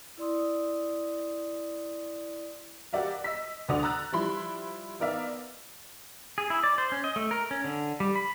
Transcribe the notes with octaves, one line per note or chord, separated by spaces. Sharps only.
E4 D5 C6 D#6
F#4 G4 A#4 D5 E5 F5
D#5 E6 B6
D2 D3 F#4 D5 D#6 F7
A#5 E6 F#6 A6
F3 G3 E4 B5 C6
B3 D#4 A#4 D5 E5 F5
G#4
E4
D5
C5
C#4
D#5
A3
A#4
C#4
D3
G3
B5